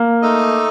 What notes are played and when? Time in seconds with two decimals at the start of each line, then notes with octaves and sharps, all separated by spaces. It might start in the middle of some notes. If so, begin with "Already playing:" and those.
Already playing: A#3
0.22 A3 D#4 A4 D#5